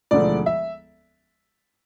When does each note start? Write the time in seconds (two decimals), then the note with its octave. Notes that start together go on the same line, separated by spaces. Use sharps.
0.11 E1 D2 D3 F3 D5
0.46 E5